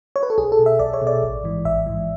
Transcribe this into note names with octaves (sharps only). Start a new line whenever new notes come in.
C#5
B4
A4
B1 G#4
A4
B2
E5
B1 D5
C#5
B2
D5
A1
G#2 E3
A1 E5
G#2 E3